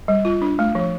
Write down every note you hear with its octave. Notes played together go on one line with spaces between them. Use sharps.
G3
F4
D4
A3
F3